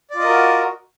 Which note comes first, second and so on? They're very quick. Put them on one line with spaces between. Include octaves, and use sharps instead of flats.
D5 F4 D#5 A#4 F#4